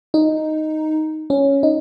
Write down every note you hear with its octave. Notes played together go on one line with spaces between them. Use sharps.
D#4
C#4
D#4